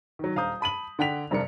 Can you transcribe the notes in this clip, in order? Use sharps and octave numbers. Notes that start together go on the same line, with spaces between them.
D#3 F#3
D#1 F5 A#5 D#6 G6
A5 B5 D#7 F#7
D3 F#5 G5 B6 F7
F1 G2 C3 D4 A#4 C#7